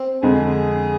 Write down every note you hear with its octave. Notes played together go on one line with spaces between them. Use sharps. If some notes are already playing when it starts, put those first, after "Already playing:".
Already playing: C4
F2 D3 G#3 G#4